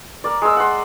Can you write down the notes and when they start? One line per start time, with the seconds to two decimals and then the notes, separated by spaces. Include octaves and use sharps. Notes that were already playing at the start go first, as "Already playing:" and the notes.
0.24 A#4 D5
0.42 G#3 E6
0.57 F#5 C6